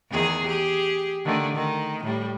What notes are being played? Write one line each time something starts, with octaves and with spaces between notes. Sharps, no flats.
E2 D#3 G#4
G4 G#4
D3 D#3 A3
D#3
A2 G3